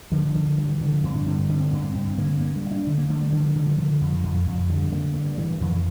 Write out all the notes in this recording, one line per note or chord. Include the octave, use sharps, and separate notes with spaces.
D3 F3
D3
G2 G3
E3
D3 E3
F3
G2 C4
D4
D3 C4
D3 C4
C4
G2 A#3
C4
G2 C4
D3 A#3
G2 A#3
G3
G2
D4
D3
A#3
D3 A3
G3
D3 E3
F3
D3 G3
F3
D3 F3
F2
F2
F2
D3 G3
D3 A#3
G2
G2 E3
F2 E3